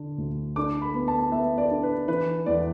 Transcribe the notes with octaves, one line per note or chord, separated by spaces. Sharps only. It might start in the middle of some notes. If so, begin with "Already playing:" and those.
Already playing: D3 D4
D2
D4 D6
B5
B3
A5
B3 E5
D5
D4
B4
E3 B4
E2 D5